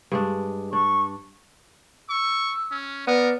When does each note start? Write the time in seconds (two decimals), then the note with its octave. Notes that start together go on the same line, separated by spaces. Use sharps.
0.12 G2 G#3 D4
0.73 D4 C#6
2.09 C#6 E6
2.71 C#4
3.07 B3 A#4 D5